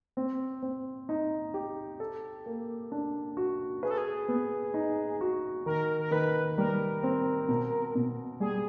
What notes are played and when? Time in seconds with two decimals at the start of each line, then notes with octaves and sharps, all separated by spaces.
0.17 C4
0.63 C4
1.09 D#4
1.54 G4
2.00 A4
2.46 A#3
2.92 D4
3.37 F#4
3.83 G#4 B4
3.90 A4
3.98 G#4
4.28 B3
4.74 D#4
5.21 F#4
5.66 D#3 A#4
6.01 A#4
6.11 D#3 B4
6.57 G3 A#4
7.03 C4
7.49 B2
7.95 B2
8.40 G3 G#4